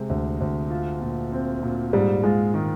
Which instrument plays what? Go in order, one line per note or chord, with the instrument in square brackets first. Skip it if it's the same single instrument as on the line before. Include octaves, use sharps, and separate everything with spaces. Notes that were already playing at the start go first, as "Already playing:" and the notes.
Already playing: [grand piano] C3 C4 [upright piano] G#3
[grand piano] D2
D2
F4
A#2
C4
A#2
[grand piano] G#2 [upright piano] G3
[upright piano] G#3 [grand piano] F4
[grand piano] D#3